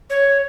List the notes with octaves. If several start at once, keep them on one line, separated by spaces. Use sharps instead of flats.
C#5